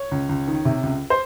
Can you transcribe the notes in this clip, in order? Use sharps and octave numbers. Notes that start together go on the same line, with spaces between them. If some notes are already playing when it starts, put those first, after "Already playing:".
Already playing: C#5
C#2
C#2
D#3
C3
C#2
C5